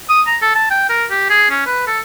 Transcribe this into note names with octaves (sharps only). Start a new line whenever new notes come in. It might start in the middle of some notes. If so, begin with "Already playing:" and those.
D#6
A#5
A4
A5
G5
A#4
G4
G#4
C#4
B4
A4